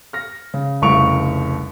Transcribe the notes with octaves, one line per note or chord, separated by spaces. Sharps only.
F6 A#6
C#3
F1 C2 C#3 C#6 D7 F7